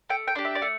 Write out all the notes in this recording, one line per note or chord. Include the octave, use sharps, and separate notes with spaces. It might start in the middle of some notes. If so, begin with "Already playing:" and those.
A3 G5
G5
D4 G4
E5
D5
A3